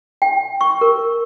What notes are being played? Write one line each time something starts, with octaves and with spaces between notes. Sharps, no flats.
G5
C#6
A#4